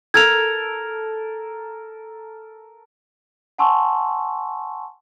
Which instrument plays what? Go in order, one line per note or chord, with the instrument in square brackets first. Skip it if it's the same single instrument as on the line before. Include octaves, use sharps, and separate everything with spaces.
[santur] A4 A#4 [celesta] G#6 F7
[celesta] F#5 G#5 A5 C6 C#6 E6